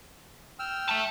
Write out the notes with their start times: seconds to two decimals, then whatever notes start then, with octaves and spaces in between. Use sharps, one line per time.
0.59 G5 E6 F6
0.90 E5 A5